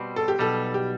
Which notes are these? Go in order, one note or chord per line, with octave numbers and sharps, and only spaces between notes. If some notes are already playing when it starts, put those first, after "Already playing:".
Already playing: B2 G3 C4
A4
G4
B1 B2 G3 A4
G4